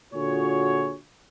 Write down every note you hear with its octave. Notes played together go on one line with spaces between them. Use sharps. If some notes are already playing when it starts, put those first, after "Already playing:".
A#2 D3 F4 F#4 G#4 C#5